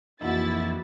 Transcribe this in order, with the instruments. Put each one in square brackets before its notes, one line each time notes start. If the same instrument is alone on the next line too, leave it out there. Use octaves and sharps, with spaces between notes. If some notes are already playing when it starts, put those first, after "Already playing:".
[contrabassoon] A#1 [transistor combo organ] F2 E3 [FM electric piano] D#4 F#4 [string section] E4 A6